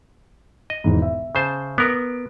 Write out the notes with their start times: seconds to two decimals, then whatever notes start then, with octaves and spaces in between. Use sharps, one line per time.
0.70 D#5
0.84 E1 E2 G#2
1.02 E5
1.35 C#3 C5 A5
1.78 B3 A#4 D6 D#6 D7